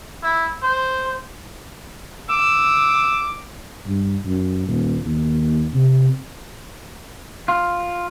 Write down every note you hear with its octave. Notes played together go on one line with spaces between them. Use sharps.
E4
C5
D6 E6
G2
F#2
D#1
D#2
C3
F4